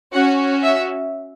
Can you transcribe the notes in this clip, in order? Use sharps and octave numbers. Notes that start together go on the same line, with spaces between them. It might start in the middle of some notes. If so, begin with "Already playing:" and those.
C#4 F#4 F#5
E5